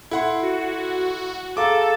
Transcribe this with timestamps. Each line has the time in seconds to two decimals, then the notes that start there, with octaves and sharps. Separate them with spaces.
0.11 E4 A4 F#5 C6
0.42 F#4
1.57 G#4 A4 F5 A#5 D6